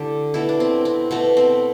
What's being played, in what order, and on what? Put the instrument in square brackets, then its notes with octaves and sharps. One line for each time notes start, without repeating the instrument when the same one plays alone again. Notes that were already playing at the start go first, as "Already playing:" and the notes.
Already playing: [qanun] D3 A3 E4 G4 A4
B2 A3 E4
D4
C4
C4
B2 A3 B3
C4